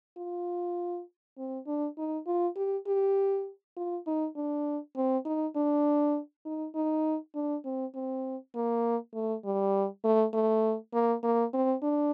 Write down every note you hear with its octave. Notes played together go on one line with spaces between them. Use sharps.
F4
C4
D4
D#4
F4
G4
G4
F4
D#4
D4
C4
D#4
D4
D#4
D#4
D4
C4
C4
A#3
A3
G3
A3
A3
A#3
A#3
C4
D4